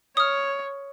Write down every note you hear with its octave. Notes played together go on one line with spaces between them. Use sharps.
C#5 D#6 F6